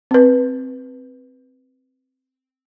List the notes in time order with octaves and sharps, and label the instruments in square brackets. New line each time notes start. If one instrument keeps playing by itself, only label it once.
[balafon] C4 B4